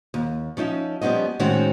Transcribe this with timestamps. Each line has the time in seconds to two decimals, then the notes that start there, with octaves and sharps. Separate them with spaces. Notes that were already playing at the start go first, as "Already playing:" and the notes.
0.14 D#2
0.57 F3 C#4 D#4 E5
1.01 F3 G3 B3 C#4 D#5
1.39 A2 D#3 G#3 C4 C#4 F#4